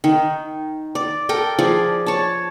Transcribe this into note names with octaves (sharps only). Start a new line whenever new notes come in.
D#3
D5
A4 A#4 G5
F3 G#4 D5
C#5 A5